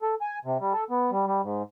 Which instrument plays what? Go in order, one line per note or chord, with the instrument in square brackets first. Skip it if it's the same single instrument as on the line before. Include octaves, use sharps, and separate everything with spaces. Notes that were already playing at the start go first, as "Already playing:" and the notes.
[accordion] A4
G#5
C3
G3
A4
B3
G3
G3
G#2